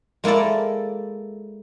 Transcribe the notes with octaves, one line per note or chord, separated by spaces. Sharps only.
G#3 A#3 E4 A4 D5